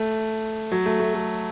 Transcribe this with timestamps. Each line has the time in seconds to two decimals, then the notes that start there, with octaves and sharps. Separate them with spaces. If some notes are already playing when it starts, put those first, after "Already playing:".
Already playing: A3
0.71 F#3
0.86 A3
1.00 A3
1.14 A3